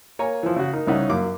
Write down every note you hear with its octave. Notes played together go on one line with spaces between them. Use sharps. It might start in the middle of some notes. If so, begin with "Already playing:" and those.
A#3 C#5 G#5 A#5
E3 F3
C#3 F#4
D#4 A#4
C2 C#3 C#4 D#4 E5 F#5
F#2 A#3 D6